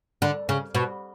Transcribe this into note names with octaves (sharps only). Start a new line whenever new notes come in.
D3
C#3
B2